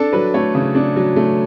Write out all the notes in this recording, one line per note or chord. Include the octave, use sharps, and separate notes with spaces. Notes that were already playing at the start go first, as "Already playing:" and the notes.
Already playing: D4 A4
F#3 B4
A3 C#5
C#3
D4
F#3
A3